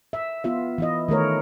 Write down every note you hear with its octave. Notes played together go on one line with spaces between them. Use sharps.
E5
B3 F4 E5
E3 E4 D#5
D#3 A3 A#4 C#5